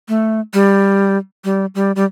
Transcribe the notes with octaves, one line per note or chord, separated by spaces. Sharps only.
A3
G3
G3
G3
G3